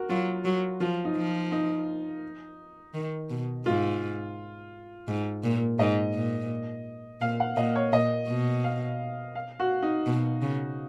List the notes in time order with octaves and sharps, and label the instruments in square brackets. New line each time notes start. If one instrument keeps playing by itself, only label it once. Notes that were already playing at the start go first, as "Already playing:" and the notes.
Already playing: [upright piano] F#4 A#4
[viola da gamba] F#3 [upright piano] F4
[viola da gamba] F#3
[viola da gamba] F3 [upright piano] F4
[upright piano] D#4
[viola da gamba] F3
[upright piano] D#4
[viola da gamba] D#3
B2
[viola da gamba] G#2 [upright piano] F4
[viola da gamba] G#2
A#2
[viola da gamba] G#2 [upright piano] D#5
[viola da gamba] A#2
[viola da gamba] A#2 [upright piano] F5
[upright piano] F#5
[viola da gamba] A#2 [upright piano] D#5
[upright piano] C#5
[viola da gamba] A#2 [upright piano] D#5
[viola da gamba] B2
[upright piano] F5
F5
F#4
D#4
[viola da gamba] B2
C#3